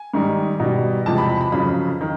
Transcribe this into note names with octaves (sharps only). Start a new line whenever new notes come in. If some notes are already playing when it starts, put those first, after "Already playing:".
Already playing: G#5
G#2 D#3 G3
B2 G3
E2 C3 F3 G#3 A5
B5
B5
B5
F2 C#3 F#3 B5
D#3